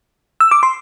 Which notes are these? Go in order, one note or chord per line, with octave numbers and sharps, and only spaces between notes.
E6
D6
C6